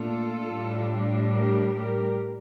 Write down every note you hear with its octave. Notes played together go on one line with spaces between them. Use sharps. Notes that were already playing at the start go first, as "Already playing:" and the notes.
Already playing: A#2 A3 D4 F4 A4
A2 G3 D4
G4 A#4
G4 A#4